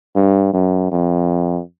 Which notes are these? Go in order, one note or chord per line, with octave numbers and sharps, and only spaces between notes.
G2
F#2
F2